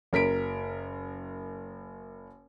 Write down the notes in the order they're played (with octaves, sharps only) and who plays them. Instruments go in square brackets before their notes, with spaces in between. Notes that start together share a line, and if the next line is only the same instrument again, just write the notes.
[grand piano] F#1 A#4 B6 D7